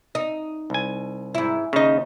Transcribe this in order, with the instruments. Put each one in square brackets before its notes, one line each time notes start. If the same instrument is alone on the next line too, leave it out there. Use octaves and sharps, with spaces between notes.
[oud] D#4
[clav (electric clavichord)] C2 G#5
[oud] G#2 E4
[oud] D#2 D#5 [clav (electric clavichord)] C#3 D#4